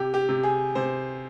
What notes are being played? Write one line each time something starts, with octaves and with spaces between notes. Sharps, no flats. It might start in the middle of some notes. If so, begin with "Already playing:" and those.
Already playing: C3 G4
G4
C3
G#4
C3 C5